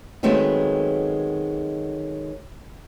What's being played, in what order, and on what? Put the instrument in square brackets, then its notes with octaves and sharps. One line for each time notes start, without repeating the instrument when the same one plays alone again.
[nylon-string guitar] D#3 F#3 G#3 A3 B3 C4